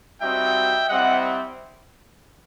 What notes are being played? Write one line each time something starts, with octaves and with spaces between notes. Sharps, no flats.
G3 C4 D#4 F#4 E5 G5
G3 C4 E4 D#5 F#5